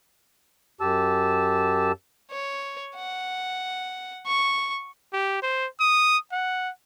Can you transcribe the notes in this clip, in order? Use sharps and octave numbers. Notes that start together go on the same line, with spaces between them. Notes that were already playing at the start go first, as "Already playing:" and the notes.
F#2 G4 A5 E6
C#5
F#5
C#6
G4
C5
D#6
F#5